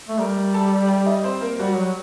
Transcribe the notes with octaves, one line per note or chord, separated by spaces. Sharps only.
A3
G3 A#4 A#5
A4 A5
G4 G5
D#4 D#5
C4 C5
A#3 A#4
G3 F#4
F#3